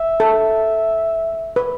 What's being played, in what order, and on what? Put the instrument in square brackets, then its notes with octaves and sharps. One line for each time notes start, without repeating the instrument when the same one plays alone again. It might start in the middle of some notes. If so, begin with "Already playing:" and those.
Already playing: [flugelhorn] E5
[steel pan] A4
B4